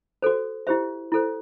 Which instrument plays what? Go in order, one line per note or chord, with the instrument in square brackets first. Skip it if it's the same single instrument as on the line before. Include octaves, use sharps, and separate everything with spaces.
[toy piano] F#4 A4 C5
E4 G4 C5 E5
E4 A4 C5